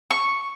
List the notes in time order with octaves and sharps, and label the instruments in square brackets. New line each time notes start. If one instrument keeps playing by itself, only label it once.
[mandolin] C#6